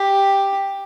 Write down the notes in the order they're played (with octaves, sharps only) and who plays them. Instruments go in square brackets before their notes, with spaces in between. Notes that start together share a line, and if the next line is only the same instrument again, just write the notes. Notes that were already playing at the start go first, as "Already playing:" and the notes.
Already playing: [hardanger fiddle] G4